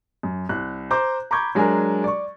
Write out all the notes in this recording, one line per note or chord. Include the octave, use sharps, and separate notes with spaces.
F#2
C2 F#6
C5 A#5 D6 G6
A#5 B5 C#6 D6 G6 G#6
F#3 G#3 D4 A#4 G#5 A#5
D5 C#6